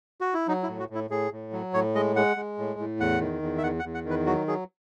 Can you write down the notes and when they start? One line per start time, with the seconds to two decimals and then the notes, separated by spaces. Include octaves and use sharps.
0.21 F#4
0.34 E4
0.48 F#3 D#4
0.63 E4
0.68 A2
0.79 F#4
0.90 A2 E4
1.10 A2 G#4
1.32 A2
1.53 F#3
1.74 A2 C#5
1.95 G#3 D#5
2.16 G#3 F#5
2.37 G#3
2.58 A2
2.79 A2
3.00 E2 F#5
3.20 D#3
3.42 E2
3.58 E5
3.63 E2 F#5
3.80 F#5
3.84 E2
3.94 F#5
4.05 D#3
4.10 B4
4.26 F#3 F#4
4.47 F#3 G#4